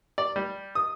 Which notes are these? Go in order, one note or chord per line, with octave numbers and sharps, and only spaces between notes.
D5
G3
D#6